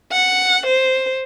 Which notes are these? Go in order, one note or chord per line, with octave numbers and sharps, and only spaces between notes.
F#5
C5